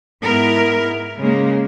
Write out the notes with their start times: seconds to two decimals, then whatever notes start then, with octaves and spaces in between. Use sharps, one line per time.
0.24 G#2 B3 E4 A#4
1.18 C#3 G#3 A#3